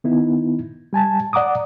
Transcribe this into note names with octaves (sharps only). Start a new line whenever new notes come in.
D#3 B3 D#4 E4
G3 G#5 A5
D5 F#5 A#5 D6 D#6